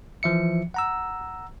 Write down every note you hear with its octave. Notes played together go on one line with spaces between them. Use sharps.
E3 F3 E5 C#7
F#5 A#5 E6